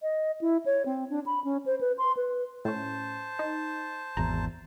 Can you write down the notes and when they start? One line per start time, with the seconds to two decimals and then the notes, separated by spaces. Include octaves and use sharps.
0.02 D#5
0.41 E4
0.66 C#5
0.86 C4
1.10 D4
1.26 B5
1.44 C#4
1.66 C5
1.81 B4
1.98 C6
2.17 B4
2.65 A2 C#4 C5 A5
3.39 D#4
4.17 G#1 E2 A#5